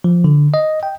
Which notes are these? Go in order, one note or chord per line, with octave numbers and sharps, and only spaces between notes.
F3
D3
D#5
G5